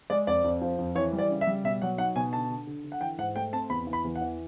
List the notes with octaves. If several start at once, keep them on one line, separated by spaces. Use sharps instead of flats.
G#3 D5
F2 D5
F2
F3
F2
E3 C#5
G3
D5
C#3
E5
G3
B2 E5
F#3 F#5
D#4 F#5
B2 G#5
D3 A5
D3
D3
D3
F#5
E3 G5
G#2 F#5
A3 G5
C4 A5
E2 B5
E3
B5
E2
F#5
E3